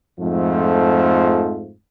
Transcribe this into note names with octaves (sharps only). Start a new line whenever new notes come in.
F2 G#2 F3 A3